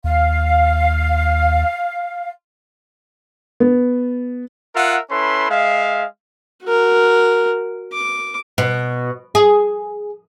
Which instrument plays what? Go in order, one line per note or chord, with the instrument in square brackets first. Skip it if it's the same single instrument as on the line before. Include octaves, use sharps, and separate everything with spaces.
[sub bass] D#2 [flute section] F5
[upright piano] B3
[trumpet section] F4 A#4 E5 F#5
C#4 E4 A4 B4 C6
G#3 E5 F5
[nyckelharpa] F#4 A#4
D6
[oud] B2
G#4